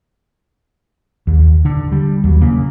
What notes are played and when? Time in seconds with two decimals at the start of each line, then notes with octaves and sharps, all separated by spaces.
1.27 D#2
1.65 D3
1.92 G3
2.24 D#2 F#3
2.41 C#3 A#3